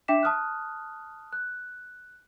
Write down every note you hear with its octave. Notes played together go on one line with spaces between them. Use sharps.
D4 E5 G5 D6 B6 E7
A5 D#6 F6 F#6
F#6